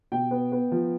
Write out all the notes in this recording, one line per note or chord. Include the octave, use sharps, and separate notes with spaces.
B2 G5
B3
B3
F3